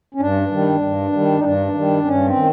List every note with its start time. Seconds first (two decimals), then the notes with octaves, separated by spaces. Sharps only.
0.14 C#4
0.20 G2 D4
0.52 D#3 G3
0.82 G2
1.12 D#3 G3
1.39 D#4
1.44 G2 D4
1.75 D#3 G3
2.05 G2 C#4
2.27 C4
2.36 D#3